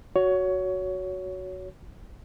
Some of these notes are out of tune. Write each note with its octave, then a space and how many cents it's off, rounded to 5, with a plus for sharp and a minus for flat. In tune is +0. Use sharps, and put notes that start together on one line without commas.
F#4 +0 C#5 +20